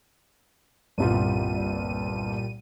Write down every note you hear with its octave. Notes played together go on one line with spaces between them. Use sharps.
G1 C2 A#2 G3 F4 D#7